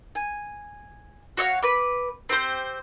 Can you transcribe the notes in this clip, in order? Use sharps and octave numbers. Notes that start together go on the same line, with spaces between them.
G#5
F#4 C#5 D#5 F5
B4 B5 D6
C4 G4 C5